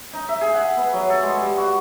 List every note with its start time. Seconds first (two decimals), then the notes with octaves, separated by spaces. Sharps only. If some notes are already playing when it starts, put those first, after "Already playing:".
0.13 D#4
0.29 E5
0.41 G#4
0.54 F#5
0.77 B3
0.93 F#3
1.10 A4
1.23 G#3
1.41 G3
1.57 F#4